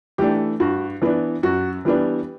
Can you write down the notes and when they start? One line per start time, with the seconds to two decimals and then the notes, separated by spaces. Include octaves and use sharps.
0.18 E3 A3 D4 G4
0.60 G2 F#4
1.02 E3 B3 D4
1.43 F#2 F#4
1.85 E3 G3 B3 D4